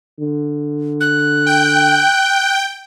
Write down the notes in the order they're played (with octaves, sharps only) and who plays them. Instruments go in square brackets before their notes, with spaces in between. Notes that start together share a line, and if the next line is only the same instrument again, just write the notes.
[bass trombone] D3
[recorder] F#6
[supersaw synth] G5 G6